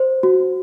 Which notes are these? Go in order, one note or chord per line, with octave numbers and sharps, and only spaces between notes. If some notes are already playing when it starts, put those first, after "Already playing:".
Already playing: C5
F#4